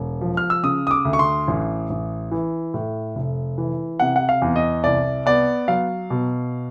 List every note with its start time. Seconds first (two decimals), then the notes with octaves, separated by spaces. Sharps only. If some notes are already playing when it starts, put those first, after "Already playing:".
Already playing: E1
0.21 F3
0.37 F6
0.50 E6
0.63 C#3 D#6
0.87 D#6
0.91 D6
1.05 D2
1.13 C#6
1.19 C6
1.48 A1
1.90 A1
2.31 E3
2.74 A2
3.16 F1
3.58 E3
4.00 C3 F#5
4.16 F#5
4.29 F5
4.42 E2
4.56 D#5
4.84 C2 D5
5.26 B3 D5
5.68 F#3 F5
6.10 B2